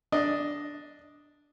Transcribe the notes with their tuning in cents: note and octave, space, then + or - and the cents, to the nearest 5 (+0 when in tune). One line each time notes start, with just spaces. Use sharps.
D4 +0 D#5 +0